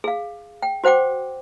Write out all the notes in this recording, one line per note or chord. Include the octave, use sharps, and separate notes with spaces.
G#4 F5
G5
F#4 C5 F#5 G5 D6